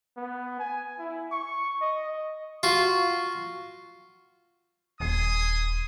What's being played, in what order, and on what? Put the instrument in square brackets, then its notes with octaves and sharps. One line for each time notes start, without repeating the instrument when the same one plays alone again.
[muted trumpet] B3
G#5
E4
C#6
D#5
[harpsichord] F4 F#4
[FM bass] D#1 [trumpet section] G#5 C6 D#6